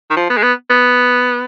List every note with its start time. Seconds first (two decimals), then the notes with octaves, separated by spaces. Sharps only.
0.10 D#3
0.16 F3
0.30 B3
0.37 G#3
0.43 B3
0.70 B3